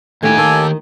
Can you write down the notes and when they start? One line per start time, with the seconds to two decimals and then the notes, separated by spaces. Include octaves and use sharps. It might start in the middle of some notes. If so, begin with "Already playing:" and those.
0.23 D#2 A3 D#4 E4 G4 G#5
0.37 D#3 A4